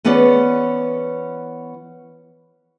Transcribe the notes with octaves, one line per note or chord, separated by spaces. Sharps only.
E3 B3 C#4 G#4 B4 D5